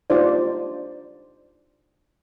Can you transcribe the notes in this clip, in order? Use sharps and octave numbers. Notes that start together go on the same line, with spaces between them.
D4 D#4 F4 G4 C5 D5